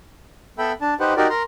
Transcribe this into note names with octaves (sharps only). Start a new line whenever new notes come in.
B3 A4 E5 G5 B5
D4 A5
D#4 G4 B4 C5 F#5
D#4 F#4 G4 A#4 D5
A#4 A#5 C6